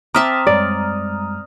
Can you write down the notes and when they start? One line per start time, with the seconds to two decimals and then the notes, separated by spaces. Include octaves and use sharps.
0.15 C4 E5 G5 A5 A#5 D6 D#6 F6
0.47 F#2 G3 G#3 D5